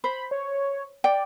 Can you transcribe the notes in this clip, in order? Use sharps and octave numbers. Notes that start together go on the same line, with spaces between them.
C5 B5
C#5
D5 G5